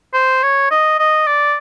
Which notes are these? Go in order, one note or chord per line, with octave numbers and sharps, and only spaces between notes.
C5
C#5
D#5
D#5
D5